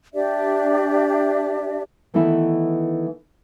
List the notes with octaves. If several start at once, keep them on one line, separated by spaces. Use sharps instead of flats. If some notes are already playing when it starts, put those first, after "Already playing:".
D4 G4 D5 E5
D#3 E3 A3 B3 D#4 E4